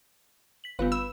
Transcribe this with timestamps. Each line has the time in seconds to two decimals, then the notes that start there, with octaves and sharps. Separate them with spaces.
0.64 B6 F#7
0.79 G1 B3 F4 B4 F5
0.92 B5 E6